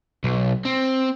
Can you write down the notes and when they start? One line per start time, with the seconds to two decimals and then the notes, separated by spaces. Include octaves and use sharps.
0.24 B1
0.65 C4